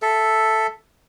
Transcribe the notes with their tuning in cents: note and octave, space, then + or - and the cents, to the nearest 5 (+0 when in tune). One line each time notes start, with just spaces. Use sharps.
A4 +0 E5 +0